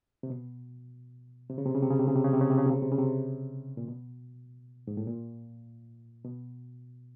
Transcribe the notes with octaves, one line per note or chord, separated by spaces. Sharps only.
C3
B2
C3
C#3
C3
C#3
C3
C#3
C3
C#3
C3
C#3
C3
C#3
C3
C#3
C3
C#3
C3
C#3
C3
A#2
B2
G#2
A2
A#2
B2